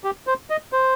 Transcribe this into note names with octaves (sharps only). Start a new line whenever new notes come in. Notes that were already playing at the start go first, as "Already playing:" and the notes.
G4
C5
D#5
C5